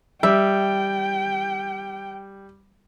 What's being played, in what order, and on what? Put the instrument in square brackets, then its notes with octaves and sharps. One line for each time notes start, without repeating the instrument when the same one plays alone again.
[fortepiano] G3 [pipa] E5 [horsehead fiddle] G5